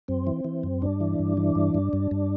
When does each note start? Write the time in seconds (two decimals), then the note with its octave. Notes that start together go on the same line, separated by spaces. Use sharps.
0.08 F#2 C4
0.27 E3
0.45 E3
0.63 F#2
0.82 G2 D4
1.00 E3
1.19 G2
1.37 E3
1.55 G2
1.74 G2
1.93 G2
2.11 G2